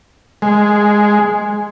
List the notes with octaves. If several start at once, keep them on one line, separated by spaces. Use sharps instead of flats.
G#3